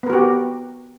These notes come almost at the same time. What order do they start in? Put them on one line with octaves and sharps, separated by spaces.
B3 A#4 F#4 G4